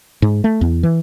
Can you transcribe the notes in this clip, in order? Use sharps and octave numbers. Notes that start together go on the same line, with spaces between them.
G#2
A3
E2
E3